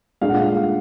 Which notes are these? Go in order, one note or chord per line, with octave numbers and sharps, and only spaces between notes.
A#2 G#3 D4 F5
F#5
F5